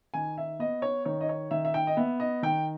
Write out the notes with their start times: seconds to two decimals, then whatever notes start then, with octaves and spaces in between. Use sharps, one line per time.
0.14 D#3 G#5
0.38 E5
0.59 B3 D#5
0.82 C#5
1.05 D#3 C#5
1.21 D#5
1.29 C#5
1.51 D#3 E5
1.65 E5
1.74 G5
1.87 D#5
1.97 B3 E5
2.20 D#5
2.43 D#3 G5